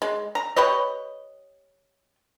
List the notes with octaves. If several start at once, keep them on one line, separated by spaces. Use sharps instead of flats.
G#3
A#5
G4 B4 C#5 D#5